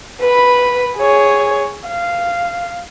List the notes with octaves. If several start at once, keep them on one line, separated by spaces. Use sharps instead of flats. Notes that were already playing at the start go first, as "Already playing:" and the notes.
B4 B5
G#4 C#5
F5